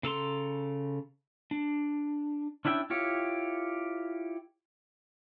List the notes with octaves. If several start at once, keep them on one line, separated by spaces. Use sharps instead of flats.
C#3 A4 A#5 C6
D4
C#4 D4 E4 E5 G5
E4 F4 G4 C#5